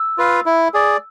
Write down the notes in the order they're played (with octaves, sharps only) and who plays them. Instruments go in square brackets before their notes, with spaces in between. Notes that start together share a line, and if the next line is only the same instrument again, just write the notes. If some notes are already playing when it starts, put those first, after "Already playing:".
Already playing: [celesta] E6
[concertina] F4 B4 F5
E4
G#4 D5